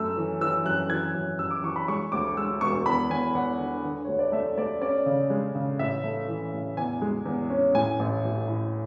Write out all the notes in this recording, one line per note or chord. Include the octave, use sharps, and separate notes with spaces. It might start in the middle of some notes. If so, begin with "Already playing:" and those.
Already playing: F#2 A3 E6
E3
E3 E6
F#2 F#6
E3 G#6
F#2
F#2 E6
D6
E3 C#6
B5
G#3 C#6
D2 D6
G#3 E6
E1 C#6
E2 B5
E2 G#5
E2 F#5
D3
D3
D2 C#5
D5
A3 E5
A3 D5
C#4 D5
C#3
G#3
C#3
A1 E5
A3
E3
A1
E2 G#5
G#3
E2
C#4
A2 G#5
A1
A1
A2